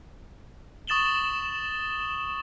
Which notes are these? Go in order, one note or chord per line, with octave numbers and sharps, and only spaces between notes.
C#6 D#6 A6 E7 F#7 G7